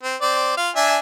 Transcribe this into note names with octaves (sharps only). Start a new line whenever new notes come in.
C4
C4 D5
F4 F5
D4 E5 G#5